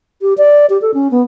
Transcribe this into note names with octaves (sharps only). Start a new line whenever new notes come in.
G4
D5
G4
A4
C#4
B3